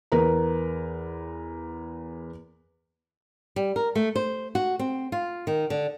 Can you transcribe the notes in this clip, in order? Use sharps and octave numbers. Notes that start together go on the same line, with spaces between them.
E2 A#4 B4 A#5
G3
A#4
A3
C5
F#4
C4
F4
D#3
D3